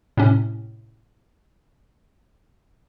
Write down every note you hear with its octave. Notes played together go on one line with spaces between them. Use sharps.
A2 C3 C#4